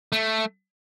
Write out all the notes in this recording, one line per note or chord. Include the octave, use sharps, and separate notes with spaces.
A3